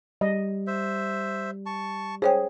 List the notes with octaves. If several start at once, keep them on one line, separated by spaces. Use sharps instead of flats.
G3 D#5
C5 E5
A5 C#6
G#4 C5 C#5 G5